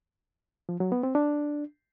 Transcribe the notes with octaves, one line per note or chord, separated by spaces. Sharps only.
F3
F#3
B3
C4
D4